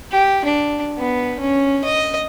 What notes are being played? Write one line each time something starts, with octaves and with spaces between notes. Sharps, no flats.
G4
D4
B3
C#4
D#5